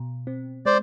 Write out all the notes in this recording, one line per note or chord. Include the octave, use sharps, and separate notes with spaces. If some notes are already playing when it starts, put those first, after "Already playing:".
Already playing: B2
C4
G#3 C5 D5